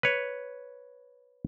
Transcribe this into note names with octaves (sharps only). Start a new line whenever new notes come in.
B4 C#5